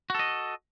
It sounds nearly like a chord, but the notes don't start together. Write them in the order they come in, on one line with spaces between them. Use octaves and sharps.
F#4 A4 D#5